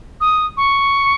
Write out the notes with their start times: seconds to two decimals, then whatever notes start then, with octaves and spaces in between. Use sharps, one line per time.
0.21 D#6
0.57 C#6